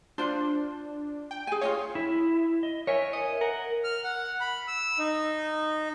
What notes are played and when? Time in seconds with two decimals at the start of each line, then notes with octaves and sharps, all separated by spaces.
0.18 D4 F4 C5
1.31 G5
1.47 G#4 G#5
1.61 F4 C#5 D#5 F5
1.95 E4
2.63 D#5
2.87 A#4 C#5 E5 G#5
3.13 D#5
3.41 A#4 F#5
3.84 F6
4.04 F#5
4.40 B5
4.68 E6
4.99 D#4